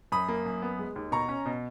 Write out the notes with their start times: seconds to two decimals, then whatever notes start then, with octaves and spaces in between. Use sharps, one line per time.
0.12 F#2 B5 D#6
0.29 A#3
0.46 F#2
0.62 B3
0.79 G#3
0.96 D#2
1.12 B2 A#5 C#6
1.29 C#4
1.46 B2